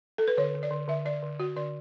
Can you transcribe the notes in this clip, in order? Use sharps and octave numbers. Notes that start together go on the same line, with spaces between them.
A4
B4
D3 C#5
D3
D5
D3
D3 E5
D3 D5
D3
D3 F#4
D3 D5